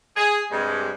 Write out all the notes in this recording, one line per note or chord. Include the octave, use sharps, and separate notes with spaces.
G#4
G2 C3 G3 G#3